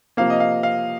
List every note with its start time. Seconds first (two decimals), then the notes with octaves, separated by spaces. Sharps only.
0.17 C3 F3 A#3 F5
0.30 D#5
0.40 F5
0.63 F5